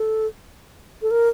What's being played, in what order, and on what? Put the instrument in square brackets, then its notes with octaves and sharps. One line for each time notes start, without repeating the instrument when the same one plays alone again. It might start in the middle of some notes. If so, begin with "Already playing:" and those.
Already playing: [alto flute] A4
A4
A#4